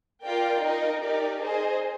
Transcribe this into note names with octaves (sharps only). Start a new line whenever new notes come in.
F4 A#4 D5 G5
D#4 A#4 D#5
D#4 G4 A#4 D5
G#4 C5 D#5